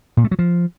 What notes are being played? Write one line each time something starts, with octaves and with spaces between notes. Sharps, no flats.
A#2
A3
F#3
F3